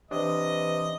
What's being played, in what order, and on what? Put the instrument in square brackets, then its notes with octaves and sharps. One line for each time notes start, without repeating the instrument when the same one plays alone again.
[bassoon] C3 [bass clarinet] E3 [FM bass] D4 [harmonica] D#5